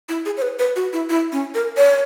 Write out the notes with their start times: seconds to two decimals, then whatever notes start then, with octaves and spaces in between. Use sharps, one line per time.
0.09 E4
0.26 G#4
0.37 C#5
0.42 B4
0.59 B4
0.76 F#4
0.93 E4
1.10 E4
1.32 C#4
1.54 A#4
1.77 C#5